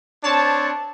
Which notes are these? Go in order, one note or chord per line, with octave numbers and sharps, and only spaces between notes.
C4 D4 C#5 A5